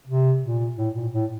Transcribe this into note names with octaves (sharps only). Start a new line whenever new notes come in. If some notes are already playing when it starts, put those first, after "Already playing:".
C3
A#2
A2
A#2
A2